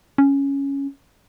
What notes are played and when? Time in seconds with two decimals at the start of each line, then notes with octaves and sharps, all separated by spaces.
0.18 C#4